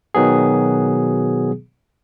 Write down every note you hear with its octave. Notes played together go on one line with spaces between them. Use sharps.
B2 D#3 F#3 B3 G#4